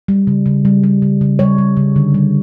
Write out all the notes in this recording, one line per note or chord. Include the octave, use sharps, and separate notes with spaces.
G3
C#3
C#3
G3
G3
C#3
C#3
G3 C#5
G3
C#3
D3
G3